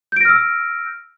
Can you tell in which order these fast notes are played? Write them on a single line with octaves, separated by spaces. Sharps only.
G6 D7 A#6 F6 E6